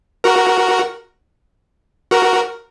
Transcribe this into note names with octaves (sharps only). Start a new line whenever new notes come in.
F#4 A#4
F#4 A#4